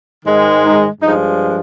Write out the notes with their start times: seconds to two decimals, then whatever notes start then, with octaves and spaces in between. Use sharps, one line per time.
0.25 G#2 D#3 G#3
0.64 D#4
1.01 G2 F3 G#3 D#4